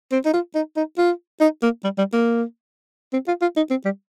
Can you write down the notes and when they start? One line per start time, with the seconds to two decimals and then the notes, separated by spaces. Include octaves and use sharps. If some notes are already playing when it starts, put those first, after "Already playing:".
0.12 C4
0.25 D#4
0.33 F4
0.55 D#4
0.76 D#4
0.98 F4
1.41 D#4
1.63 A#3
1.84 G3
1.98 G3
2.13 A#3
3.13 C4
3.28 F4
3.42 F4
3.57 D#4
3.70 C4
3.85 G3